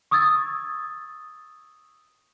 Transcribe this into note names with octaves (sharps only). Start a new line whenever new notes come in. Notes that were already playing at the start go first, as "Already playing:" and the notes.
C#6 D#6 E6 G#6 A6